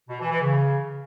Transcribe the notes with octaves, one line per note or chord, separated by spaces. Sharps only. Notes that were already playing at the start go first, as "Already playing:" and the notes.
B2
E3
E3
C#3